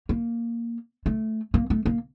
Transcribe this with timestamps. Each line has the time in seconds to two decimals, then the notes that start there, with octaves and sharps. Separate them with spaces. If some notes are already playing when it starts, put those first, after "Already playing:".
0.09 A#3
1.06 A3
1.54 A#3
1.70 A3
1.85 A#3